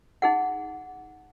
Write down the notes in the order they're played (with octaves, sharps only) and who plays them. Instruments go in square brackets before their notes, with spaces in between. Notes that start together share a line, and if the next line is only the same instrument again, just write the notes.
[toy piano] D#4 G#4 F#5